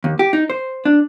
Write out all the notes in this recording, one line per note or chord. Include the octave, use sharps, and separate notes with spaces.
D#2
G4
D#4
C5
D4